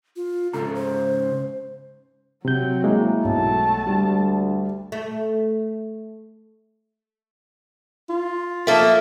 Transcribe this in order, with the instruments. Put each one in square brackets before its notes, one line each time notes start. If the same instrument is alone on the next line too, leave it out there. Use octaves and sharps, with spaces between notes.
[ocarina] F4
[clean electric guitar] G#2 C#3 A#5 [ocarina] A4
[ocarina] C5
[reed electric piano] C3 G6 [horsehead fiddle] F#3 C4
[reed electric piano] G#3 [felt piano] A#3 [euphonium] E4
[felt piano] B1 [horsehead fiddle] A3 A5
[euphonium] D2 [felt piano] G3
[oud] A3
[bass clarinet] F4
[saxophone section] F3 A3 A#3 [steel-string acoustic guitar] A4 E5